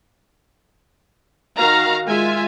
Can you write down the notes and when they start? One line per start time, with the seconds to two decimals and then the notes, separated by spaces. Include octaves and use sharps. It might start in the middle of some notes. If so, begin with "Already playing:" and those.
1.57 D#3 F#4 F5 A#5
2.05 G#3 F4 E5 G#5